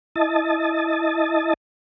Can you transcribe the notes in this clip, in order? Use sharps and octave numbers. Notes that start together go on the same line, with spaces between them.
E4 D#5 A5